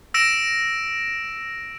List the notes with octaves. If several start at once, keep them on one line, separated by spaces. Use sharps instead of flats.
E6 A#6 D7 E7